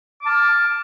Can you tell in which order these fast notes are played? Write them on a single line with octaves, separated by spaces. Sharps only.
D6 A5 F6